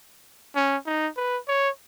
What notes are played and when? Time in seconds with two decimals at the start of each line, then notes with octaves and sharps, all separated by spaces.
0.55 C#4
0.86 D#4
1.17 B4
1.48 C#5